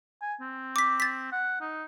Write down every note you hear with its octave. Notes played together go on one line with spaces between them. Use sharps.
G#5
C4
D6 B6
A6 B6
F#5
D#4